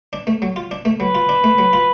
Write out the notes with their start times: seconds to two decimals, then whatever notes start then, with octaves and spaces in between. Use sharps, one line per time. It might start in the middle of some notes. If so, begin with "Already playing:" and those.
0.13 D4
0.27 A3
0.42 F#3
0.56 F4
0.71 D4
0.85 A3
1.00 F#3 B4
1.15 F4
1.29 D4
1.44 A3
1.58 F#3
1.73 F4